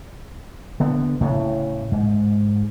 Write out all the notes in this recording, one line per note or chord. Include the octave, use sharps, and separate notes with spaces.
D3 B3
A2 C#3
G#2